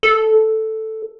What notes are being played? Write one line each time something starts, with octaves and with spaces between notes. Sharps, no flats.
A4